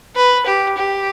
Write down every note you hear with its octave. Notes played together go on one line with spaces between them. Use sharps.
B4
G4
G4